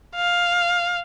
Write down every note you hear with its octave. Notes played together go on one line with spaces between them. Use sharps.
F5